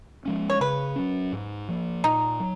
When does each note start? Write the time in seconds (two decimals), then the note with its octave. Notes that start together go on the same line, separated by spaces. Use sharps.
0.25 F3 G#3 C#4
0.50 C#5
0.60 C#3 B4
0.96 F#3 C#4
1.32 G#2
1.69 F3 A#3
2.04 A#2 D#4
2.40 F#3